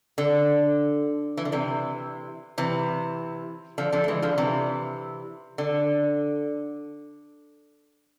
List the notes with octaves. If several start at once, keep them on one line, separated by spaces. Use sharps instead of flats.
D3
E3
D3
C3 E3
C3 E3
D3 F3
D3 F3
A3
E3 G#3
D3 F3
C3 E3
D3